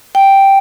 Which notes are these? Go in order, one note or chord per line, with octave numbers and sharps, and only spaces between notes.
G5